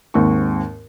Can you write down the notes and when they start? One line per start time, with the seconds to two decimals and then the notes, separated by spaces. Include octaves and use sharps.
0.14 D#2 G#2 C4 C#6